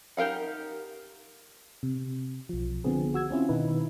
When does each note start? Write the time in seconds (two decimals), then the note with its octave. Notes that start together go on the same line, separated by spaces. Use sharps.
0.17 D#4 G4 A#4 F5 F#5
1.83 C3
2.49 B1 F3
2.84 D3 F3 B3 C4 G#4
3.14 F#4 E6 G#6
3.31 C4 C#4 E4 F4
3.49 B2 D#3 D#4 E4 B4